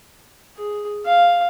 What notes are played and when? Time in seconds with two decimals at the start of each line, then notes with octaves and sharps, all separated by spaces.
0.57 G#4
1.06 F5